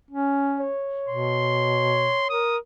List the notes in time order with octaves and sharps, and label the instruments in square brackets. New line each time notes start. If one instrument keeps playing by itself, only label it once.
[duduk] C#4
[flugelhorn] C#5
[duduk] B2 [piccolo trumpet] C6
[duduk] A#4 [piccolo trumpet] D#6